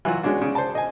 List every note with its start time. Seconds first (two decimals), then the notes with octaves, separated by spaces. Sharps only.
0.05 E3 F#3 F4 F#4
0.23 G#3 C#4 D4 F#4
0.42 C#3
0.55 C5 A5
0.75 D#5 G#5